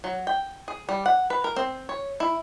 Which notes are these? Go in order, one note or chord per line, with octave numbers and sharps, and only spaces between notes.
F#3
G5
G#4
G3
F#5
B4
A#4
C4
C#5
E4